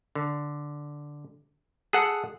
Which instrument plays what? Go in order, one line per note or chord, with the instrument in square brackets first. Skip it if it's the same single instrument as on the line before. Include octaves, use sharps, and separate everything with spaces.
[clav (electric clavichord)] D3
G#4 A4 F#5